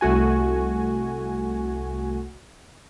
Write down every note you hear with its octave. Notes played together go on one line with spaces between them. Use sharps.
C2 A3 F#4 G#5